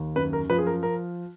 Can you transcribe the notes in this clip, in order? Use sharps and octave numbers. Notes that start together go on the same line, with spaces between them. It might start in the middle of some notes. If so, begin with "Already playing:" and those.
Already playing: D#2
F#2 B4
A#4
F3 B4
G#4
A#4
A#4